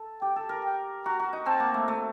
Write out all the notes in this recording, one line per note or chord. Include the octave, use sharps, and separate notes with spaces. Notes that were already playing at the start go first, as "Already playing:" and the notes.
Already playing: A4
G4 G5
A4
A#4
G5
F#4 A#5
F#4
D#4
C4 A5
A#3
A3
A3